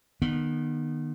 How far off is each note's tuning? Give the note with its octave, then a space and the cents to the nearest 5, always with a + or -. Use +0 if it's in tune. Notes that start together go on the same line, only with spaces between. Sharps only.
D#3 -30 B3 -25